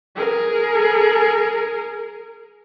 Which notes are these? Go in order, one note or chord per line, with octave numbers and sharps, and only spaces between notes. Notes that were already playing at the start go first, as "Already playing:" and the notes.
G#4 A#4